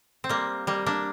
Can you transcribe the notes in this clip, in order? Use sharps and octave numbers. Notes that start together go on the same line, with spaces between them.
C4
G3 A#3
G3 A#3
A#3 D4